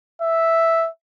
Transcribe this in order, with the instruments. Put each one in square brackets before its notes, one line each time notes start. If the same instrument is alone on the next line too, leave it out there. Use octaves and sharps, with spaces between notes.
[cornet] E5